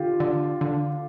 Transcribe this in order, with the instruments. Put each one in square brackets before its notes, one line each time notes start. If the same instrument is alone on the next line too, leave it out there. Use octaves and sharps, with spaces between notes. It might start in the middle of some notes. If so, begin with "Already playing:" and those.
Already playing: [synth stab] D3 [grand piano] F4 G4
[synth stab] D3
D3